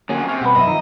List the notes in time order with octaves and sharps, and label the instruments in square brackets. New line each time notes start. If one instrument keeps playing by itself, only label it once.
[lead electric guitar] F2 F#3 [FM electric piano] D3 A#3 C#4 [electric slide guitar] G#4
[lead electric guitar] C3 [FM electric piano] G#5 C#6 F6
[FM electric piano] B2 G3 B3 [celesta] F#5 B5
[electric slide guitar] F#2 E5 [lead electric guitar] D#5
[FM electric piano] D#3 F3 [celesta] A#5